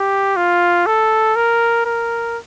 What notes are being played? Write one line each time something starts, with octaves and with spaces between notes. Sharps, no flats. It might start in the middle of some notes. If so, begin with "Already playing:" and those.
Already playing: G4
F4
A4
A#4
A#4